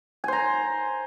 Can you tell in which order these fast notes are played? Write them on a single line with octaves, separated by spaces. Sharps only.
G#5 C5 A#5